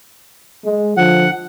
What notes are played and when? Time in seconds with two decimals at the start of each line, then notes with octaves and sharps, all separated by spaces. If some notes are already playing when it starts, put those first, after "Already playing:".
0.65 G#3
0.97 D3 F3 F#5